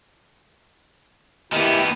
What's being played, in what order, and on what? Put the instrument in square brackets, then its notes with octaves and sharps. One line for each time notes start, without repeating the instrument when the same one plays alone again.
[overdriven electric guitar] D#3 B3 [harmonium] E4 G4